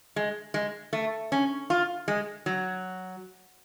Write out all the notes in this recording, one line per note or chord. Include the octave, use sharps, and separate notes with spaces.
G#3
G#3
A3
C#4
F4
G#3
F#3